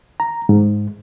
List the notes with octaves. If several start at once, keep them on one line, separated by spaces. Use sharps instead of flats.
A#5
G#2